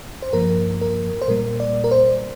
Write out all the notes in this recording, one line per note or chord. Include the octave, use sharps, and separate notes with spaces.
C5
G2 F3 A#3 A#4
A#4
C5
A#2 G3 A#3 A#4
D5
A#4
C5